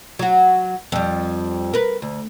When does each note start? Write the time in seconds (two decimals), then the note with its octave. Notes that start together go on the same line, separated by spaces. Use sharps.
0.19 F#3 F#4
0.92 F2 G3
1.73 A#4 B4
2.02 D2